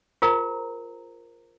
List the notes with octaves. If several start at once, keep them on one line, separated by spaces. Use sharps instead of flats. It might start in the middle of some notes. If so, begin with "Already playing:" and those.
F4 G#4 A#4 C5 A#5